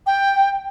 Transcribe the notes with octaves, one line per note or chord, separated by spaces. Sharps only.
G5